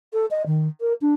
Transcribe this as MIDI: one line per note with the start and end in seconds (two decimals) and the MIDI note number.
0.13 0.26 69
0.31 0.43 75
0.46 0.68 51
0.81 0.93 70
1.01 1.14 62